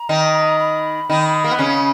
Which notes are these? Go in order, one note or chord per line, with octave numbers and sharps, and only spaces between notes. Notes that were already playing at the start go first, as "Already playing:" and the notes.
Already playing: A#5
D#3 D#4
B5
D#3 D#4
A#3
B3
C#3 C#4 B5